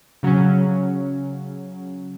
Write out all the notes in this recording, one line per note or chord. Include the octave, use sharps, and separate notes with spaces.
C#3 F#3 C#4